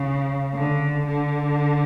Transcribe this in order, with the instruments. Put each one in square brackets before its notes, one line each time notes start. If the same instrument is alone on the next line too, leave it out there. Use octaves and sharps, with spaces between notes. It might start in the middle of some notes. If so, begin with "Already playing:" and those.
Already playing: [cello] C#3
D3
D3